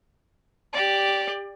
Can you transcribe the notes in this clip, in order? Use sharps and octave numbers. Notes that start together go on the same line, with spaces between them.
G4 D5